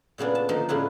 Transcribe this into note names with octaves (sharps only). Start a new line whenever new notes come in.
A#2 C#3 B3 D4
A5
D3 F3 A#3 D#4
A2 C#3 B3 D4 E4 B4